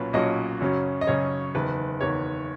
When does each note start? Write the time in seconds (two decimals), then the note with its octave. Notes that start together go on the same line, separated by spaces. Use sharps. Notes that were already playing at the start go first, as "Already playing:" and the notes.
Already playing: B1 A#2 F#3 C#4 B4
0.13 B1 A#2 F#3 C#4 D#5
0.61 F#2 C#3 F#3 C#4
1.01 D#5
1.07 F#2 C#3 F#3 C#4 C#5
1.55 F#1 E2 D#3 B4
2.01 F#1 E2 D#3 C#5